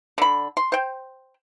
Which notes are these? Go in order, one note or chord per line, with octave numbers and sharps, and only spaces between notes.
D3 B5
C6
C5 G5